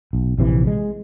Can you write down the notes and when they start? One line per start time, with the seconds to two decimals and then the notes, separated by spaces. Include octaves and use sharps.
0.13 B1
0.38 A#1 C3 E3
0.67 G#3